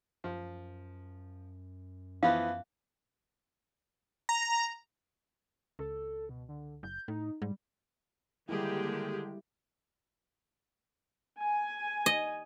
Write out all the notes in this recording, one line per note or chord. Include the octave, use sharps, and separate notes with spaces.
F#2 F3
E3 F3 B3 F5
A#5
C#2 A4
B2
D3
F#1 G6
A2 D#4
G#2 G3
D3 D#3 G3 G#3 A#3 E4 G4 G#4
G#5
D#5